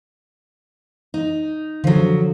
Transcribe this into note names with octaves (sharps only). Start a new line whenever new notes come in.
D#4
D3 F3 F#3